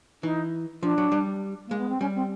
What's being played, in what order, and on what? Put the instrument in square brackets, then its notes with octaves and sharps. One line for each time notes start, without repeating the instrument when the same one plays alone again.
[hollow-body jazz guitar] E3 [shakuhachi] D#4
[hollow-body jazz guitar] F3 [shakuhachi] D4
[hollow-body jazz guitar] F#3
G3
[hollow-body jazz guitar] G#3 [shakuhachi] A#3
[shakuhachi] B3
C4
[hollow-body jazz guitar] G3 [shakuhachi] C#4
[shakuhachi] C4